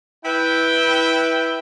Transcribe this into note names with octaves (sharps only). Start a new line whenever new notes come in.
E4 B4 G5